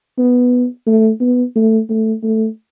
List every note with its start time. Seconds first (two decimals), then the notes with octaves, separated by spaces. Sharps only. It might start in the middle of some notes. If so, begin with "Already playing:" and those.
0.18 B3
0.87 A3
1.20 B3
1.56 A3
1.90 A3
2.24 A3